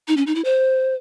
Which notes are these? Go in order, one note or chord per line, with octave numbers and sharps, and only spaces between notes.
D#4
C#4
D#4
E4
C5